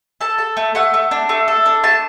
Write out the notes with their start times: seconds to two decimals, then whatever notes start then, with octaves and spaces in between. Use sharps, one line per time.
0.21 A4 A5
0.38 A4
0.57 A3
0.75 A3 F#5
0.94 A3
1.11 D4
1.29 A3
1.48 A4
1.66 D4
1.83 A3 A5